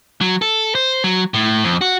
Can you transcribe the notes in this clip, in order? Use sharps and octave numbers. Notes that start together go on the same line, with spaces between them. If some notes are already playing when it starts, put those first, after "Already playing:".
F#3
A4
C5
F#3
A2
F2
F#4